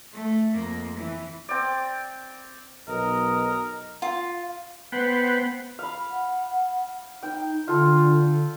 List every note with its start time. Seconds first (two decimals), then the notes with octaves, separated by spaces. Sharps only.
0.13 A3
0.54 F2 A#3
0.96 E3
1.49 C4 D5
2.88 B1 A#4 D#5
4.02 F4
4.92 B3 B4 C5 F#5 G5
5.79 F5 B5
6.10 F#5
7.23 D#4 G5
7.68 D3 F4 A4